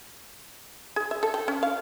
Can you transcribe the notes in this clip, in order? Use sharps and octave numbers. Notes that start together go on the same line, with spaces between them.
G#4
E5
A4
G5
C#4
F5